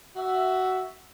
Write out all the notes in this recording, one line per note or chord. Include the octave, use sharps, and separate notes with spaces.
F#4 E5